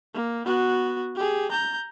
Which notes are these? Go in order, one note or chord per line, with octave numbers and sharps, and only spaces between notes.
A#3
B3 F#4
G4 G#4
A#5 G6